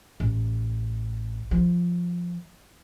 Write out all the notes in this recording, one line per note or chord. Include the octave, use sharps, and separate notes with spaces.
A1
F3